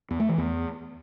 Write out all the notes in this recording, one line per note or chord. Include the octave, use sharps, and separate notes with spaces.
E2
A3
E3
E2